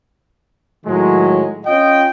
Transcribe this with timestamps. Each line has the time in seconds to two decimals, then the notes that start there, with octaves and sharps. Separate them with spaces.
0.85 A2 D#3 F#3 G#3
1.66 C#4 F4 D#5 G5